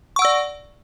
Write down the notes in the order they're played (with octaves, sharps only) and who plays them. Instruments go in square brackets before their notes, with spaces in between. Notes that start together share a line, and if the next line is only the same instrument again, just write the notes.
[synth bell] C#6
F#5
E6
D5